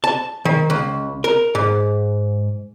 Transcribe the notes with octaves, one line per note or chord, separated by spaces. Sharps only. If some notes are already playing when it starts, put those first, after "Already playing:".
A5
D#3
C#2
A#4
G#2